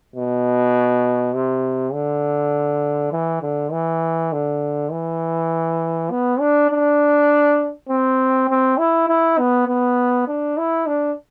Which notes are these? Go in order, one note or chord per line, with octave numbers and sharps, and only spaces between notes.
B2
C3
D3
E3
D3
E3
D3
E3
B3
D4
D4
C4
C4
E4
E4
B3
B3
D4
E4
D4